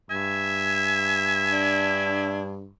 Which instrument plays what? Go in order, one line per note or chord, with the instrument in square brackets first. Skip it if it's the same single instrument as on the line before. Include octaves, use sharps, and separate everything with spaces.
[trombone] G2 [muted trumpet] E5 [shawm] G#5
[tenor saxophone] D4